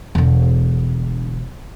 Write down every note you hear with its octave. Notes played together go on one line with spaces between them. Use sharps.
E1 D3